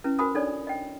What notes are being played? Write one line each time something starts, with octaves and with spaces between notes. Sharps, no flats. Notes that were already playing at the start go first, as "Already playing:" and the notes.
C#4 E4 B4
F#4 A#4 C5 G#5 B5 D#6
D4 D#4 A4 C#5 D5
D#5 G5